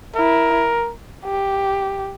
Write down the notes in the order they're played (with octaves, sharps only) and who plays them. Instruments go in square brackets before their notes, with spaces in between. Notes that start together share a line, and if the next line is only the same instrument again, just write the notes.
[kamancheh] E4 [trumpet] A#4
[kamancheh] G4